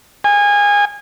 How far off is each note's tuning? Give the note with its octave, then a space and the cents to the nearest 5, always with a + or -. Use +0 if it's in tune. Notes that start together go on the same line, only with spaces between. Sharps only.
G#5 -25